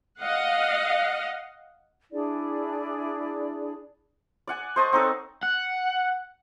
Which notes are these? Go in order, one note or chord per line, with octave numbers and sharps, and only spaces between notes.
D#5 F5 F#5
D4 E4 G#4 D5
D5 F#5 G#5
C5 D#5 A5 C#6
C4 D#4 A4 C#5
F#5